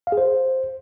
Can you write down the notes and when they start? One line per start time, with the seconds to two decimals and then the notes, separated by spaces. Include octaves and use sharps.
0.07 F5
0.12 G#4
0.17 C5